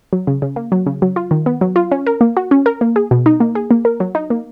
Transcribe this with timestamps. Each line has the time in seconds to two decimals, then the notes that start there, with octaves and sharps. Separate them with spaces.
0.13 F#3
0.27 C#3
0.42 C#3
0.56 A#3
0.72 F#3
0.86 C#3
1.02 F#3
1.16 F4
1.31 D#3
1.46 B3
1.61 F#3
1.76 F4
1.92 C#4
2.06 A#4
2.21 A#3
2.37 F#4
2.51 C#4
2.66 A#4
2.81 A#3
2.96 G#4
3.11 B2
3.26 D#4
3.40 A#3
3.55 G#4
3.71 A#3
3.85 A#4
4.00 F#3
4.15 D#4
4.30 A#3